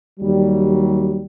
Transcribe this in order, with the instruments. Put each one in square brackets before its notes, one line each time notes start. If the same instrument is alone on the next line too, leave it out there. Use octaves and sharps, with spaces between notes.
[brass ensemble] D#2 F#3 G3